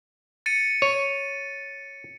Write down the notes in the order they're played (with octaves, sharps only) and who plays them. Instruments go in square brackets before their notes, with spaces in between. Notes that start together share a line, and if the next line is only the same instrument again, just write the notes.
[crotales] A6 C#7 D#7
[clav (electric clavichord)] C#5 [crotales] D#7